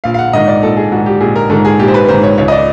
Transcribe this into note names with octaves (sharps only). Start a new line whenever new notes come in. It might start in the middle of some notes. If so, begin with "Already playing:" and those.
A#1 F5
F5
F#5
G#2 D#3 D#5
D5
A#1 A4
G#4
G#2 D#3 F#4
G4
A#1 G#4
A#4
G#2 D#3 A4
G#4
A#1 G4
C5
B4
G#2 D#3 C5
C#5
C#2 C#5
D#5
D5